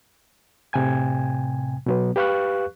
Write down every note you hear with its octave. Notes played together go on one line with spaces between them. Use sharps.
A2 C3 G5 G#5 G#6
B2 F#3 B3
G4 B4 F5 C#6 F#6